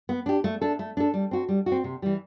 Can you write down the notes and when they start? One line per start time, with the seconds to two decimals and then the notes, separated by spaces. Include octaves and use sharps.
0.09 B3
0.26 D4 G4
0.44 A3
0.61 D4 A4
0.79 A3
0.97 D4 A4
1.14 G3
1.31 C4 F#4
1.49 G3
1.66 F#4
1.72 C4
1.84 C3
2.02 E3 G3